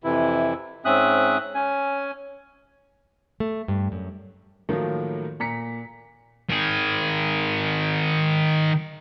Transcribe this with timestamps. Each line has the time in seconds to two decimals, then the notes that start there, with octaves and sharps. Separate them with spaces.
0.04 F2 C3 E3 E4
0.85 G#2 C4 C#4 E5 D#6 F#6
1.55 C#4 G#5
3.40 A3
3.68 G2
3.92 F#2
4.69 A2 D#3 F3 F#3 A3 A#3
5.40 A#2 A#5 B6 C#7
6.50 D#3 G#4